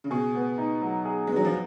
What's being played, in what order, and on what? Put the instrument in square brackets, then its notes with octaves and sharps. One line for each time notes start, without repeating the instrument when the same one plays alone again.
[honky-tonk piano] C#3
[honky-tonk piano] B2 [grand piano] G#4
[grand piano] B3
D#4
F#3
G#4
[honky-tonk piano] G#3 [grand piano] B3
[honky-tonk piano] F#3
F3